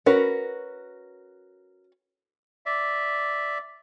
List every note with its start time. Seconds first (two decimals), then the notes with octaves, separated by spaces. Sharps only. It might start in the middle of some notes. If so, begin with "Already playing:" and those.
0.06 C#4 F#4 A#4 B4
2.66 D5 E5